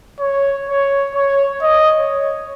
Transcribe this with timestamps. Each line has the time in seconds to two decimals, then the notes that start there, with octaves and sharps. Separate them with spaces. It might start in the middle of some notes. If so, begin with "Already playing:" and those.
0.20 C#5
0.69 C#5
1.15 C#5
1.62 D#5
1.99 C#5